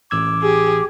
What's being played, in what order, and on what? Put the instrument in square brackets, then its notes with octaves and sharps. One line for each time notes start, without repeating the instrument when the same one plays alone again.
[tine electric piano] A1 E6 G#6 [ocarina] D6
[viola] G4 G#4